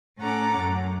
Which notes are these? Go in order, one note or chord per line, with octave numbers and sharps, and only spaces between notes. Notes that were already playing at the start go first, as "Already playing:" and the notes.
A2 C#4 A4 F#5 A#5 D6
F#2